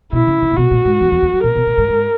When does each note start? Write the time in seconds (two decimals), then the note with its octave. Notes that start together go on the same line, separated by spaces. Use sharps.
0.12 B2 E4
0.27 C#3
0.42 C#3
0.51 A#2
0.57 B2 F#4
0.71 A#2
0.85 G#2
1.01 E2
1.11 E2
1.22 E2
1.33 F#2
1.44 A#2 A#4
1.56 B2
1.66 A#2
1.78 G#2
1.88 G#2